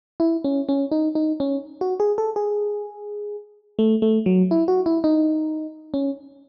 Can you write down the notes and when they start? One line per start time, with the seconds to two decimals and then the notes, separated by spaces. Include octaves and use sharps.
0.20 E4
0.44 C#4
0.69 C#4
0.91 D#4
1.15 D#4
1.40 C#4
1.81 F#4
2.00 G#4
2.18 A4
2.36 G#4
3.79 A3
4.02 A3
4.26 F#3
4.51 E4
4.68 F#4
4.86 E4
5.04 D#4
5.94 C#4